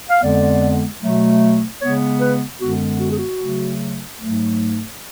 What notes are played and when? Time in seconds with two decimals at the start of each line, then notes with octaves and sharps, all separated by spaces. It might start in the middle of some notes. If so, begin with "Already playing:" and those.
0.10 F5
0.22 F2 D3 G#3 B3 D5
1.01 B2 F#3 A3
1.81 C#3 G#3 B3 C#5
2.21 B4
2.60 F#2 D3 G#3 B3 F#4
2.99 F#4
3.09 G#4
3.18 F#4
3.39 C#3 F#3 A3
4.19 G#2 F#3 A3